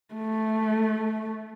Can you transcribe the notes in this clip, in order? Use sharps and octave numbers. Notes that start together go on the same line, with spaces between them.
A3